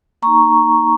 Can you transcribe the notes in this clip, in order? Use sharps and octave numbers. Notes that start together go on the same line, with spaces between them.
A#3 D#4 A#5 C#6